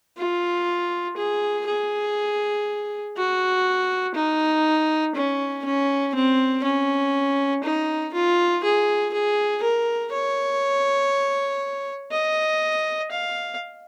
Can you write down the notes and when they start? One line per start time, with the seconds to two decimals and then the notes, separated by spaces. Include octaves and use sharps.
0.17 F4
1.17 G#4
1.66 G#4
3.16 F#4
4.15 D#4
5.15 C#4
5.65 C#4
6.15 C4
6.64 C#4
7.63 D#4
8.13 F4
8.63 G#4
9.13 G#4
9.63 A#4
10.12 C#5
12.12 D#5
13.11 F5